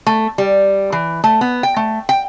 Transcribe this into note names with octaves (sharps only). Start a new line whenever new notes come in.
A3
G3
E3
A3
B3
G5
A3
G5